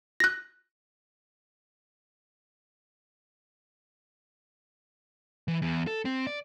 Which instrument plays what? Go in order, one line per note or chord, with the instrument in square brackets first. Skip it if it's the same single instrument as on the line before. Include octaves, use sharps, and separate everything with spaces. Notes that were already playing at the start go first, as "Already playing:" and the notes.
[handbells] F#6 A#6
[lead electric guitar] E3
E2
A4
C4
D5